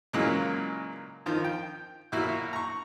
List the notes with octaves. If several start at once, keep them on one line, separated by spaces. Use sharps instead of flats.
A#2 C#3 E3 F#3 G#3 A#3
F2 D#3 F3
G5
B1 A#2 E4 F#4
A#5 C#6